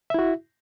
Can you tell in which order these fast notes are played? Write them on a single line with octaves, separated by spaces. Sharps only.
E5 E4 F#4